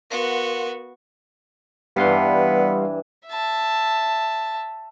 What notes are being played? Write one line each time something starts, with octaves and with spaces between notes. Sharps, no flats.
B3 F#4 A#4 F5 C6
G2 E3 G3 B3 F5 C6
E5 A5